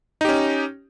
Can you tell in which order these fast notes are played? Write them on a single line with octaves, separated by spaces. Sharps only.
D#4 G4 C#4